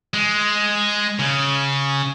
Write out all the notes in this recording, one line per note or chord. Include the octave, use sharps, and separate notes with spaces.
G#3
C#3